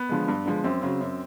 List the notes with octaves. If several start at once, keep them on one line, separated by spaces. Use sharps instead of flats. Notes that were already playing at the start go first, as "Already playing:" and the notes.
Already playing: B3
D3 F3 G#3
G2
D3 F3 G#3
F#2 C4
C#3 F#3
F#2